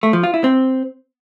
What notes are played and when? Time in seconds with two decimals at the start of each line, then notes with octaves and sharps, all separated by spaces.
0.03 A3
0.13 F3
0.23 F4
0.34 E4
0.44 C4